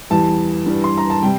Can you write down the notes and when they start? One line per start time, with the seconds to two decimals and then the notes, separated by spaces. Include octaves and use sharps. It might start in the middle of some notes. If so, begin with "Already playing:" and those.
0.10 E2 E3 G3 A5
0.66 G2 E3 G3
0.84 C6
0.97 A#5
1.10 A5
1.22 C3 G3 G5